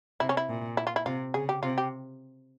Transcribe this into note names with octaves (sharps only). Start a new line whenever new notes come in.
C3 E4
C#4
E4
A#2
E4
F4
E4
C3 F4
C#3 G#4
G4
C3 F4
G4